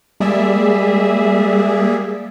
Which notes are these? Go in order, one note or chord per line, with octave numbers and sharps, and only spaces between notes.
G3 G#3 A#3 G#4 D5 E5